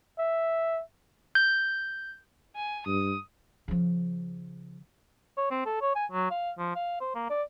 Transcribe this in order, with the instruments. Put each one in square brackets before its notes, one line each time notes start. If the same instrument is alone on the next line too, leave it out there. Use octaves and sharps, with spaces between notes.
[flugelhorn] E5
[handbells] G6
[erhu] G#5
[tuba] G2 [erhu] D#6
[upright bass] C#3 F3
[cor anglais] C#5
C4
A4
C#5
G#5
F#3
F5
F3
F5
C5
A#3
D5